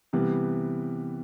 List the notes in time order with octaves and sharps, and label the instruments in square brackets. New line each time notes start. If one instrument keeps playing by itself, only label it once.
[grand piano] C3 E3 G3 B3